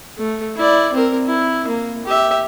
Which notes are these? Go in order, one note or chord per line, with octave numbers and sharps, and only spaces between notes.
A3
E4 D5
C4 A#4
E4
A#3
G4 E5